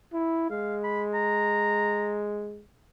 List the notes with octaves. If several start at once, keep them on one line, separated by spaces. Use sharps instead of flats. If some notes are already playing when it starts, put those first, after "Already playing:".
E4
G#3 F5
B5
A#5